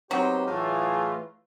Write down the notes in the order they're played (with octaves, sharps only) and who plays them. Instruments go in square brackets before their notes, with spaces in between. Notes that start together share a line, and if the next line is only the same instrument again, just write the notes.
[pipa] F#3 [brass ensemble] B3 [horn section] C4 D#4 C5 [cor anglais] G4
[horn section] A2 E3 F4 [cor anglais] A3 [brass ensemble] G#4